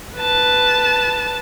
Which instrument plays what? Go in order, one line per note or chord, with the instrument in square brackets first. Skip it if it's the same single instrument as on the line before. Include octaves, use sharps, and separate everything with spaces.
[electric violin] B4 A5